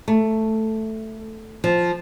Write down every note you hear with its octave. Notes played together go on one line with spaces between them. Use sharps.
A3
F3